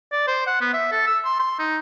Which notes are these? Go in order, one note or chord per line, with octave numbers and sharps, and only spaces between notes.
D5
C5
F#5
B3
E5
A4
E6
C6
C6
D#4